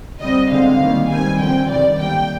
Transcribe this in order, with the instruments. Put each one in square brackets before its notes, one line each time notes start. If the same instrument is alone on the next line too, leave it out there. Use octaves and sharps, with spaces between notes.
[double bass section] D3 G3 C4 [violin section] D#5
[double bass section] D3 G#3 C4 [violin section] F5
[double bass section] D#3 G3 A#3
[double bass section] D#3 G3 C4 [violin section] G#5
[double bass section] D3 F3 C4 [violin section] G5
[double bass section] C3 D#3 G3 C4 [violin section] D5
[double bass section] D3 G3 A#3 [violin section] G5